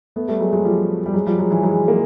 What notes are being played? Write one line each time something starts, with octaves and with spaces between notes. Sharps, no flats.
A3 B3
G3 A3
F#3 G#3
F#3 G#3
F3 G3
G3
F#3 G#3
F3 G3
F#3 G#3
E3 F#3
F#3 G#3
G#3 A#3